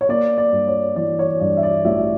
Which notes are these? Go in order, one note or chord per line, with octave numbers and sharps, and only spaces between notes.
C#5
A#3 D5
D5
G2
C#5
E3 D5
C#5
G2 D5
E5
D5
A1 E5